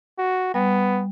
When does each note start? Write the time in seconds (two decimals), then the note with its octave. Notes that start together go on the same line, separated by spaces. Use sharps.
0.18 F#4
0.54 G3 B3